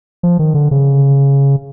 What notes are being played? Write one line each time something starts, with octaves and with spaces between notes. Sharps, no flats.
F3
D#3
D3
C#3